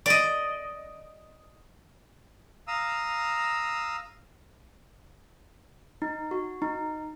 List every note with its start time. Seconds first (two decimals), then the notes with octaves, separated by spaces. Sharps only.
0.06 D5 D#5
2.68 F5 A#5 D#6 E6
6.02 D#4
6.31 F#4
6.62 D#4